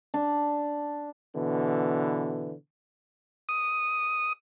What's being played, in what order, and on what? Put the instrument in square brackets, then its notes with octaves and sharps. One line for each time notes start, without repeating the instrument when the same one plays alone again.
[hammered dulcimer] D4
[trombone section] B2 D3 E3
[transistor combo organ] D#6